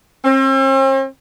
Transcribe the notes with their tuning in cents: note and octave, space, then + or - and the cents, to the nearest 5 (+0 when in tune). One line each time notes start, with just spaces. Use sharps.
C4 +45